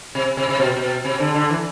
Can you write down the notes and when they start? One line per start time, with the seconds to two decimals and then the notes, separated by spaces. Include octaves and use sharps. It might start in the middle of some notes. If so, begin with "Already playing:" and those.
0.15 C3
0.37 C3
0.49 C3
0.60 B2
0.77 B2
1.05 C3
1.20 D3
1.34 D3
1.50 E3